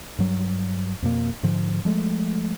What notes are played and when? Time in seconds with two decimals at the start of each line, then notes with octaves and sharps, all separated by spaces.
0.18 G2 F#3 G3
1.02 F2 B2 A#3
1.43 G#2 D3 F3
1.85 F3 G#3 A3